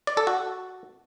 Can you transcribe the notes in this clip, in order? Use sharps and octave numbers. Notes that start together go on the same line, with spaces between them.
D5
A4
F#4